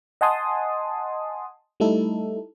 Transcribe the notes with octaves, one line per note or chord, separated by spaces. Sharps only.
D#5 F#5 G#5 A5 C6 D#6
G3 A3 D#4 E4 A4